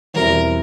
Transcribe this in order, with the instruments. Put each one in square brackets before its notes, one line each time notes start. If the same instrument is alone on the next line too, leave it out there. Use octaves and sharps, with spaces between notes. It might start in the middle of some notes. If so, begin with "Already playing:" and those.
[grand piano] E2 B2 G3 C4 E4 [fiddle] A#4